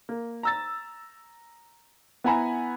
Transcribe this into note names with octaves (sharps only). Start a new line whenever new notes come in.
A#3
A#5 E6 A6
B3 E4 F#5 G#5 A#5 B5